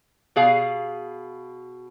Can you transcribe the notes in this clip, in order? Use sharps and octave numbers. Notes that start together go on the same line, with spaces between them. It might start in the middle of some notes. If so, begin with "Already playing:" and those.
B2 G#4 F5